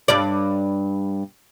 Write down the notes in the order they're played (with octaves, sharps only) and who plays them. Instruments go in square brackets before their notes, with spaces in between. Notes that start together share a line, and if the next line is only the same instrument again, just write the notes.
[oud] G2 D5